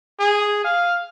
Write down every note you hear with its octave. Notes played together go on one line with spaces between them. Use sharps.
G#4
F5